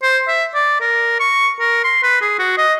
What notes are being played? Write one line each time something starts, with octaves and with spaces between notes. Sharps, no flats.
C5
E5
D5
A#4
C#6
A#4
C6
B4
G#4
F#4
D#5